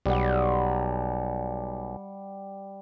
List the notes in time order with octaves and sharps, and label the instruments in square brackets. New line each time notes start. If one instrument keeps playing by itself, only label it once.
[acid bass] B1 [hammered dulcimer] G3 F#5